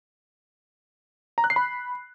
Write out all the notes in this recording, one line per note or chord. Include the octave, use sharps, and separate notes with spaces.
A#5
F#6
C7
B5